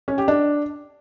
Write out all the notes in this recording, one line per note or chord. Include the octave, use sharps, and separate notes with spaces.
C#4
G4
D4